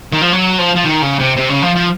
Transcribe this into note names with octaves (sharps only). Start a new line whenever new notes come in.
D#3
F3
F#3
F3
F3
D#3
C#3
C3
C3
C#3
F3
F3